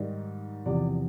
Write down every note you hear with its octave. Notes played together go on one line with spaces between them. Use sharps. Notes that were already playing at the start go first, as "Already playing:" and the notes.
Already playing: G#2 D#3 G3
E2 C3 F3 D5